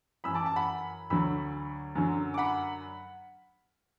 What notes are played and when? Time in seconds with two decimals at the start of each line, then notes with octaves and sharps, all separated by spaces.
0.24 F#2 E3 B5 E6
0.35 A5 D6
0.46 A5
0.56 F#5 B5
1.10 D2 D3 F#3 B5 E6
1.95 F#2 D3 F#3
2.34 D6
2.38 F#5 B5